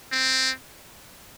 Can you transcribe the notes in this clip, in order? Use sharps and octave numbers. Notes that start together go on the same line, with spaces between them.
C4